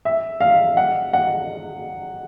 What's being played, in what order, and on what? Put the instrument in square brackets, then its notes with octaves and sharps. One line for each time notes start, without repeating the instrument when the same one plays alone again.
[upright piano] E5
F5
F#5
F#5